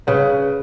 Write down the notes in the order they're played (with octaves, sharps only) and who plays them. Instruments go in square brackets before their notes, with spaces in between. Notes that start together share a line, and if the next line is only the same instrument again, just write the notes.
[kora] C#3 [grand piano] B4